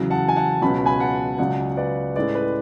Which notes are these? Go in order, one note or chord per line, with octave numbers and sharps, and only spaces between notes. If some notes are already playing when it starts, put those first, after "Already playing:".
Already playing: E2 C#3 F#3
F#5 A5
G#5
F#5 A5
C#2 B2 F#3 C#4 B5
G#5 B5
F#5 A5
C#2 C#3 F#3 D5 F#5
B4 D5
A2 G#3 C#4 B4 D5
B4